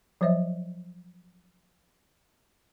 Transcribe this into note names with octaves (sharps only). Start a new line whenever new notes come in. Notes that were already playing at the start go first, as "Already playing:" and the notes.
F3 F#3 C5 C#5 D#5 E5